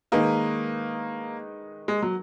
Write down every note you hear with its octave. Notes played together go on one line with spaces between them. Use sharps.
D#3 G#3 A#3 D#4 G#4 B4
G#3
F#3